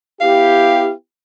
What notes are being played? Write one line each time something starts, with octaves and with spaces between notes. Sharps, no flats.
B3 E4 G4 F5